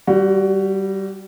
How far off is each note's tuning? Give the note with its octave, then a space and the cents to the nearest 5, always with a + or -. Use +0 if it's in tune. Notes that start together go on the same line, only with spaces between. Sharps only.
G3 -15 F#4 +15